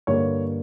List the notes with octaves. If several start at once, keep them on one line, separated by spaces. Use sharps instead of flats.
G2 D3 A#3 C#5